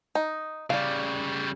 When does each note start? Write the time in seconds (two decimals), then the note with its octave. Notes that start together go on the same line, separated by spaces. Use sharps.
0.15 D#4
0.70 C#3 G3 D5 F5